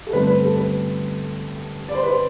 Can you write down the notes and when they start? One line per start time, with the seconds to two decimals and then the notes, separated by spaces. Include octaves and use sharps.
0.07 A4
0.13 G2 D3 A3 C4 B4
0.27 B4
0.43 A4
0.56 B4
1.88 D5
1.95 C5
2.03 B4
2.10 C5